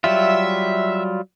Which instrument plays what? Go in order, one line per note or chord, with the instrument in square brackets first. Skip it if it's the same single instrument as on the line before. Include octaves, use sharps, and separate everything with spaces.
[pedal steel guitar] F#3 G3 F4 [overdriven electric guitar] E5